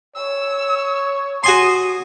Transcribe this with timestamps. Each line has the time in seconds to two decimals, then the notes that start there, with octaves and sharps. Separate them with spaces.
0.16 C#5 E6
1.44 F#4 G#5 C6 D#6